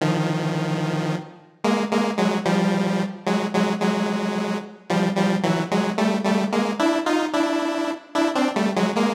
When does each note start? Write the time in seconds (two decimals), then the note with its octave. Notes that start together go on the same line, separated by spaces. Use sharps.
0.01 D#3 F3
1.64 G#3 A#3
1.91 G#3 A#3
2.18 F#3 G#3
2.45 F3 G3
3.27 F#3 G#3
3.54 F#3 G#3
3.81 F#3 G#3
4.90 F3 G3
5.17 F3 G3
5.44 E3 F#3
5.71 F#3 G#3
5.98 G3 A3
6.25 G3 A3
6.52 G#3 A#3
6.79 D4 E4
7.06 D#4 F4
7.34 D4 E4
8.15 D4 E4
8.35 C4 D4
8.56 G3 A3
8.77 F#3 G#3
8.96 G#3 A#3